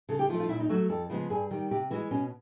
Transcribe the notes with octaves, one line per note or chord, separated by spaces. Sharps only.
C#3 A4
G4
F3 A3 F4
F4
A#2 E4
D#4
F#3 A3 F#4
F2 A4
C#3 F3 G#3 B3
G2 G#4
D#3 G3
C3 G4
E3 G#3 F#4
B2 C#4